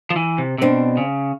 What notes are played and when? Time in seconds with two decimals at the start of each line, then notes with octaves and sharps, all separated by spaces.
0.10 F3
0.16 E3
0.38 C3
0.58 C3
0.61 B2 C4 D4
0.97 C#3